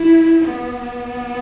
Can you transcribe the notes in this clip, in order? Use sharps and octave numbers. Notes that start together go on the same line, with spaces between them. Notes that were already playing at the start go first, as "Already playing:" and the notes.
Already playing: E4
B3
B3